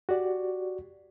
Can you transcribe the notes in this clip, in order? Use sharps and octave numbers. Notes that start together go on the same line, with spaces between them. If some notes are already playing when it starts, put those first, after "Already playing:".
F#4 G4 D5